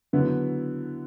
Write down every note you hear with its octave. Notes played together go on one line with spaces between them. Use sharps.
D3 F#3 B3 E4